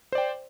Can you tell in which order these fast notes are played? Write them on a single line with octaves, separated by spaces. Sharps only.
C5 D5 G5